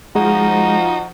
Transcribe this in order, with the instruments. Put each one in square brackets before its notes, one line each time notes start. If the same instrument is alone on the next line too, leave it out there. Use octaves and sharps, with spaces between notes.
[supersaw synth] F3 [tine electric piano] G#3 [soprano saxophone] D#4 [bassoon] F#4